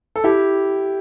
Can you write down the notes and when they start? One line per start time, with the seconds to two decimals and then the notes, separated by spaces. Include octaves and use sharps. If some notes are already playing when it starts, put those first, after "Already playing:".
0.16 A4
0.24 E4 G4